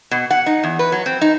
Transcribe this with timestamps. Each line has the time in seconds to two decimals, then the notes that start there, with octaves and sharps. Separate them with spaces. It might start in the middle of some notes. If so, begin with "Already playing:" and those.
0.11 B2
0.31 F#5
0.46 D#4
0.64 E2
0.79 B4
0.92 F#3
1.06 C4
1.21 D#4